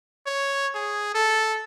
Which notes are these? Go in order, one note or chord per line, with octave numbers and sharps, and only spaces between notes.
C#5
G#4
A4